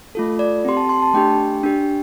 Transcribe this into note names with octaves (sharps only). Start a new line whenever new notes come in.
A3 F4 A4
D5
C4 G4 C6
A5
C6
A5
A3 D4 G4 G5
D4 G4